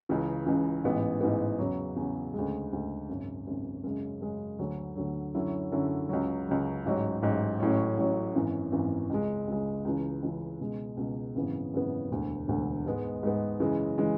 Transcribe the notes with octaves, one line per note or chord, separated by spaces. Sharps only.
C#2 C#3 E3
C#2 C#3 E3
A1 G#2 E3 B3
A1 G#2 E3 B3
E2 C#3 F#3
E2 C#3 F#3
D2 C#3 G#3
D2 C#3 G#3
G#1 F#2 C#3
G#1 F#2 C#3
F#2 C#3 G#3
F#2 C#3 G#3
D2 D3 F#3
D2 D3 F#3
F#2 D3 F#3 C#4 E4
F#2 D3 F#3 C#4 E4
C#2 C#3 F#3
C#2 C#3 F#3
A1 G#2 F#3
A1 G#2 F#3
A1 A2 F#3 C#4
A1 A2 F#3 C#4
G#1 F#2 E3
G#1 F#2 E3
C#2 C#3 G#3
C#2 C#3 G#3
C#2 C#3 E3
C#2 C#3 E3
C#2 B2 G#3
C#2 B2 G#3
G#1 F#2 C#3 E3 B3
G#1 F#2 C#3 E3 B3
E1 D2 D3
E1 D2 D3
G#2 G#3 B3
G#2 G#3 B3
F#2 C#3 E3 G#3
C#3 E3 G#3